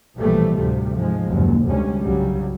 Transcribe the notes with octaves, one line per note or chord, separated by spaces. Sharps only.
B1 A#2 E3 F3 G3 A3
D2 A2 C3 F3 G3 A3
G#2 F3 G#3
F#1 D#2 A#2
F1 D2 C3 G3 G#3 C#4
C2 G2 C#3 F#3 G3